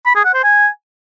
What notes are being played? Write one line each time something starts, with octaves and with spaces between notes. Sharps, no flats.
B5
G#4
F#5
C5
G#5